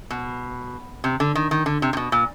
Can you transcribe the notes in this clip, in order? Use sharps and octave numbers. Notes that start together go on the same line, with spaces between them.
B2
C3
D3
D#3
D#3
D3
C3
C3
B2
A#2